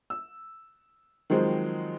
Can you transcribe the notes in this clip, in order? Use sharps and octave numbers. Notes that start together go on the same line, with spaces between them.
E6
D#3 F3 F#3 G#3 C4